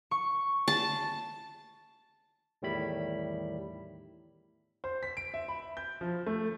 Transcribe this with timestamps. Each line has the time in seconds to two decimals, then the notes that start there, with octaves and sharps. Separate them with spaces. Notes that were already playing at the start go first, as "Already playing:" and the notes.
0.11 C#6
0.68 A5
2.62 E2 A2 D#3 G3 E4 B5
4.84 C5
5.03 B6
5.17 D7
5.34 E5
5.48 B5
5.77 G6
6.01 F3
6.27 A3